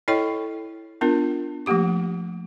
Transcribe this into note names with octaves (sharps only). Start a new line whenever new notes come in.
E4 A4 C#5 D#5 G5 C#6
B3 D4 F4 A#4
F3 A3 A#3 G4 D6